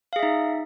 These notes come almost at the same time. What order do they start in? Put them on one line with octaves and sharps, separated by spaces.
F5 G#4 E5 D#4